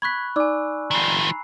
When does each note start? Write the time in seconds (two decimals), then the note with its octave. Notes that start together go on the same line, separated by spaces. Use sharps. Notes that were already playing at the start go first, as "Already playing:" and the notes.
0.02 B5 C#6 F#6 G#6 B6
0.36 D#4 D5 G#5 D6 E6
0.91 D#3 F3 A#5 B5 C7